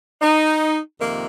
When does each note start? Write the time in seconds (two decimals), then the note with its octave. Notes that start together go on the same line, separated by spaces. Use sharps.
0.21 D#4
0.99 F2 C3 D#3 A#3